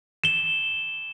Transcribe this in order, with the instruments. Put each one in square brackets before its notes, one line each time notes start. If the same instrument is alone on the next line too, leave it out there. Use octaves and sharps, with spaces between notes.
[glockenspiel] E7 G7